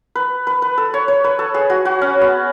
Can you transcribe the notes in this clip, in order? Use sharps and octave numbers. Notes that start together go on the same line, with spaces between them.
B4
B4
B4
A4
C#5
C#5
B4
A4
G#4
F#4
F#4
C#4
B3